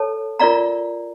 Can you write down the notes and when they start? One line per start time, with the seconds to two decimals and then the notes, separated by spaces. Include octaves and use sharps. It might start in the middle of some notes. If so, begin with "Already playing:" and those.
Already playing: A4 C#5 A5
0.39 F4 A#4 D5 F5 A#5